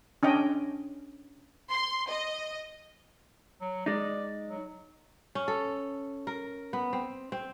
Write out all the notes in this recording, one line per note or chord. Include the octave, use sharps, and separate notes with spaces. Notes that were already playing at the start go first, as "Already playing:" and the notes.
C#4 D4 D#5 G5
C6
D#5
F#3
G#3 D#4 D5
F#3
C#4
A4
A#4
B3
C4
C4